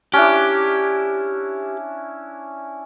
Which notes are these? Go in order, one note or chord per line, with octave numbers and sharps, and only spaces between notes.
C#4 D4 E4 G4